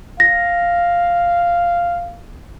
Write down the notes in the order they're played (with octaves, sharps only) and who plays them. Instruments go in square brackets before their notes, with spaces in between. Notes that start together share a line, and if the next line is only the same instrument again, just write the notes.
[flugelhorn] F5 [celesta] A#6